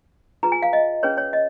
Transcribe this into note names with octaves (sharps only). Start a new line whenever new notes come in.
F4 G#4 B4 A#5
G#5
F5
D#5
C#4 G#4 B4 C#5
C#5
D#5